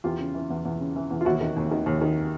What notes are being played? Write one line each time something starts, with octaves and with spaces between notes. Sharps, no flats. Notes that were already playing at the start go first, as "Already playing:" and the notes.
E2 F4 G4
C#3
E3
E2
E2
C#3
E3
E2
F4
D#2 E4 F#4
D#3
D#2
D#3
D#2
D#3